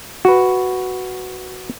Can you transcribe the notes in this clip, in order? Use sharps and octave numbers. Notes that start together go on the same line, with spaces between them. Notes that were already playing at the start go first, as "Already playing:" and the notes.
F#4 B4